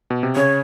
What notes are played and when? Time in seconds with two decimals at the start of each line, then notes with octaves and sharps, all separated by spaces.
0.10 B2
0.23 C3
0.36 C#3 C#5